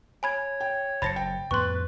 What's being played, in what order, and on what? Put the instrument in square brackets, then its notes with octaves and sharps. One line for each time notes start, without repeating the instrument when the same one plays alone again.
[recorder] C#5 [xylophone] G#5 B5 G#6
[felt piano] G5
[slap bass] F#1 [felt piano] C5 A5 A6 [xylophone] B5 A#6 C#7
[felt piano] G5
[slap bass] F2 A2 B3 [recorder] B4 [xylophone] C6 C#6